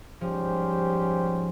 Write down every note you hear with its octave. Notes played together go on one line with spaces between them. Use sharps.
G#2 F3 G3 C#4 G4 C5